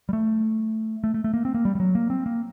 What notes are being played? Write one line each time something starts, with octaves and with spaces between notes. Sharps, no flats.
G3
A3
A3
A3
A3
A#3
C4
A#3
G3
G3
F#3
A#3
C4
A#3